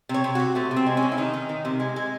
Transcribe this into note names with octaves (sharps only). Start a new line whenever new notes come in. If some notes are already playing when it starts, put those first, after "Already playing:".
C3
C#5
C3
C3 F#4
C3 A3
C3
C4
G#3
C#4
C3
E4
D#3 D#4
D#3
D#3
C3
G#3
G#3